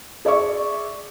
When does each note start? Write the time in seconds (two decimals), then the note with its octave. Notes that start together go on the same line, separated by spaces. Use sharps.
0.25 G#4 D5 E5 C#6